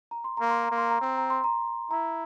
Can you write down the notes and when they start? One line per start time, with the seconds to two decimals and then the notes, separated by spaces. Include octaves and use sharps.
0.11 A#5
0.24 C6
0.37 A#3 A#5
0.51 C6
0.63 A#5
0.71 A#3
0.78 C6
0.91 A#5
1.01 C4 C6
1.18 A#5
1.30 C6
1.44 A#5
1.91 E4 A#5